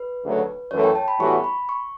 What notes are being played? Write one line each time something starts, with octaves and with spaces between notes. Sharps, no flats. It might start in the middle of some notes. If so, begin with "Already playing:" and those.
Already playing: B4
D2 C#3 F#3 A3
F#2 E3 A3 C#5
G5
A5
B5
A2 E3 G3 B3 F#4 C#6
B5
C#6